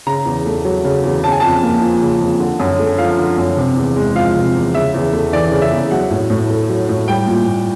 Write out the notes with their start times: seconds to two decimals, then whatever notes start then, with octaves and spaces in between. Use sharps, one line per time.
0.07 C#3 A#5
0.25 E2
0.46 A3
0.65 F#3
0.85 C#3
1.04 E2
1.23 C#3 A5
1.32 G#5
1.40 F2 A5
1.63 A#3
1.82 F3
2.02 C#3
2.21 F2
2.40 D3
2.60 F#2
2.79 A3
2.98 F3 F5
3.18 D3
3.38 F#2
3.57 C3
3.76 E2
3.96 G#3
4.15 F3 F5
4.36 C3
4.55 E2
4.74 C#3 E5
4.94 E2
5.13 A3
5.33 E3 D5
5.52 C#3
5.62 E5
5.71 E2
5.91 F#3 F#5
6.11 A2
6.30 A2
6.50 A3
6.70 F#3
6.89 A2
7.08 G3 G5
7.27 A#2
7.47 A#2